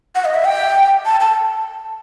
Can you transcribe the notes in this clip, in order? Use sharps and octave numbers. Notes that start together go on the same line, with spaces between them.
F#5
D#5
E5
G5
A5
A5